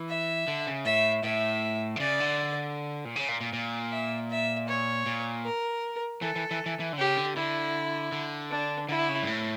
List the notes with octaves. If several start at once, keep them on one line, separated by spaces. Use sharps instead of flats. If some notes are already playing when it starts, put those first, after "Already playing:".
Already playing: E3
E5
D3
C#3
A2 E5
A2 E5
D3
C#3 D5
D3
A#2
C#3
A#2
A#2
A#2
E5
E5
C#5
A#2
A#4
E3 A4
E3
E3
E3
E3
D3
C#3 G4
D3
D3 E4
D3
D4
D3 E4
C#3
G2
A2